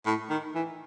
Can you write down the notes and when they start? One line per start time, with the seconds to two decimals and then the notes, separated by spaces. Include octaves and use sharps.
0.06 A2
0.30 D#3
0.55 E3